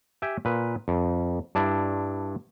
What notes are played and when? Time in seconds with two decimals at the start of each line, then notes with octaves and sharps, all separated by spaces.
0.22 G4 E5 G5 G#5
0.45 A#2 B4
0.88 F2
1.55 G2 D4 E4